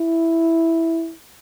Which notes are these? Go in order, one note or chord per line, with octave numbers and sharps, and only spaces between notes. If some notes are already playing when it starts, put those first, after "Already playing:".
Already playing: E4